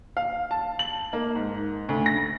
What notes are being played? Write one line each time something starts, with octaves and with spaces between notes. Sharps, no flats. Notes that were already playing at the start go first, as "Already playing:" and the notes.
F5
A5
F#7
A#3
G#2
D2
A#6